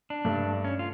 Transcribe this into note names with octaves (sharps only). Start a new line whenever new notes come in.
D4
G2 A3
C#4
F4